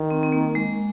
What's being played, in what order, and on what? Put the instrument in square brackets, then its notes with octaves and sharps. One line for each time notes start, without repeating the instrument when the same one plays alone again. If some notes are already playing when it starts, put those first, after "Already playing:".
Already playing: [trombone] D#3
[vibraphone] C4
C4
A#3
G#3